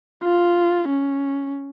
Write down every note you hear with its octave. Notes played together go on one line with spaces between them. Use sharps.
F4
C#4